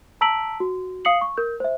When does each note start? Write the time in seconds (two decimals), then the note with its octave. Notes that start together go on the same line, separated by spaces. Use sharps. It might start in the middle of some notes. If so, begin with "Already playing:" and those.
0.21 A5 A#5 E6 B6 D7 F#7
0.60 F#4
1.05 F5 D#6 C7 C#7 F#7
1.21 C#6
1.37 A#4 G6
1.60 C5 E5